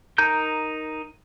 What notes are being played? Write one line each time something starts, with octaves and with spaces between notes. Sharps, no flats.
D#4 A#4 A#5 G6